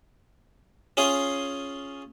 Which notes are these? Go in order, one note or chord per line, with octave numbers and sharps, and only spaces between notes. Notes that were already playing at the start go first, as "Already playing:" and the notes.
C#4 F4 G#4 F5 C6